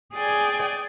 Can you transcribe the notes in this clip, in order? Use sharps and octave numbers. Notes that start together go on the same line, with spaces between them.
G#4 D5 G5 G#5